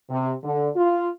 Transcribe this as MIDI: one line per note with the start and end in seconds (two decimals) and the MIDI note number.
0.10 0.32 48
0.44 0.68 50
0.76 1.09 65